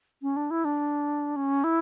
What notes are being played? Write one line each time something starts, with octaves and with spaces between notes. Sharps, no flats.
C#4
D4
E4
D4
C#4
E4